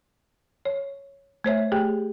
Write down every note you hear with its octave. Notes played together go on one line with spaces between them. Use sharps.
C#5
A3 C5 C#5 E5
A3 G4 G#4 G5